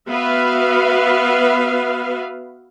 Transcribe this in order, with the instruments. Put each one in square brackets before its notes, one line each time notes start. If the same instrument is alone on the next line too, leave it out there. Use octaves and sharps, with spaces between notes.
[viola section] B3 F#4 B4 E5 F5